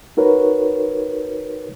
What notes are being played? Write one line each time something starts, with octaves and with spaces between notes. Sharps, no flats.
D#4 F#4 A#4 B4 C#5